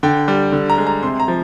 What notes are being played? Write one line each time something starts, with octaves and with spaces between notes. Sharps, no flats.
D3 G5
G3
D3
A#5
G#3
A#5
C3 C6
A#5
F3